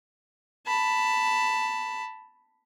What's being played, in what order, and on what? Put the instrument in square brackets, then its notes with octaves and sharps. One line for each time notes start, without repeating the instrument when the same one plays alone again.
[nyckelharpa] A5 B5